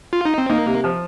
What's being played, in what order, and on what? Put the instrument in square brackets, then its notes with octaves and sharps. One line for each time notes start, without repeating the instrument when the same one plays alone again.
[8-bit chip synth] F4
D#4
C4
[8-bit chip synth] A#3 [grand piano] D#4
[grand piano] C3
F3